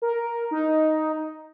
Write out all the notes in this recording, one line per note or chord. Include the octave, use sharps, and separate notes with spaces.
A#4
D#4